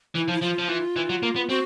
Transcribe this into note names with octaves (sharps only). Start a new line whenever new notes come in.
E3 E4
F3
E4
F3 F4
F3
E3
E3
F#3
A#3
B3
C4 F#4